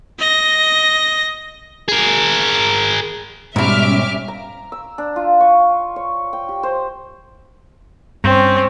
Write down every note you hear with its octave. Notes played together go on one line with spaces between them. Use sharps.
D#5 A#6
G#4 A#4
G#2 B2 G3 C#4 E5 D6 F6
A#5
E6
D4
F4
C#6
C#5
G5
G4
C5
G2 C4 C#4